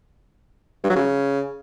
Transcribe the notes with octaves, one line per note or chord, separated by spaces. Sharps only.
G2
F#3
C#3